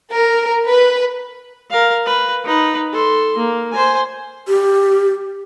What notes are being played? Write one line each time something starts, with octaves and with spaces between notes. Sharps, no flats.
A#4
B4
A#4 F5
B4
D#4 B4
A4 C6
A#3
C5 G#5
G4